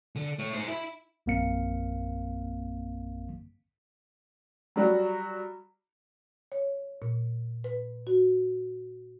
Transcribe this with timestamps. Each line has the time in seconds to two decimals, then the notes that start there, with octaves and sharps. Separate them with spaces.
0.16 D3
0.39 A3 C#5
0.54 D#4 C5
0.68 E4 B5
1.26 A#1 F#2 A#3 C4 F5 C#7
4.76 F#3 G3 F#4
6.52 C#5
7.02 A#2
7.64 B4
8.07 F#4